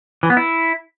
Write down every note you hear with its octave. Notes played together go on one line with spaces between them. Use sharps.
E3
B3
E4